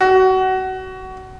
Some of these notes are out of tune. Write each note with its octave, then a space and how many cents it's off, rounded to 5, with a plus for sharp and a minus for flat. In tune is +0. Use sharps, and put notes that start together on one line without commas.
F#4 +25